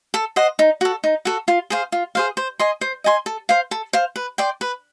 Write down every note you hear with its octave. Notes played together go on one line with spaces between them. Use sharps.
A4
C5 D#5 F#5
D#4
F#4 A4
D#4
F#4 A4
F4
G#4 C5 F5
F4
G#4 C5 F5
C5
D#5 G#5 C6
C5
D#5 G#5 C6
A4
C5 F5
A4
C5 F5
B4
D5 G5 C6
B4